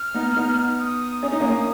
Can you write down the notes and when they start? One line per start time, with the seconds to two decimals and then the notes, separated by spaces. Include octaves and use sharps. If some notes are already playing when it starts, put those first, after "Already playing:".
Already playing: F6
0.14 B3 D#4
0.36 B3 D#4
0.80 D#6
1.23 C#4
1.32 D#4
1.40 A#3 C#4